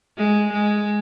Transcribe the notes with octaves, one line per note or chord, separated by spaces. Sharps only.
G#3
G#3